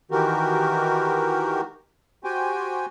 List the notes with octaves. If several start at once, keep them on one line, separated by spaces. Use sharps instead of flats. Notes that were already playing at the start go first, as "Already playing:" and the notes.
D#3 E3 F#4 G4 A#4
F#4 G4 C5 G5 G#5